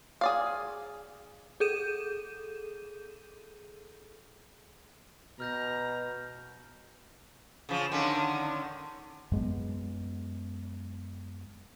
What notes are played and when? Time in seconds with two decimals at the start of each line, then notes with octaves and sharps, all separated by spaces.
0.21 G#4 D5 F5
1.60 G#4 A4 G6 D#7 E7
5.40 B2 A#5 F6 G6 A#6
7.69 C#3 F3
7.92 D3 D#3 C#4
9.32 F#2 G#3 B3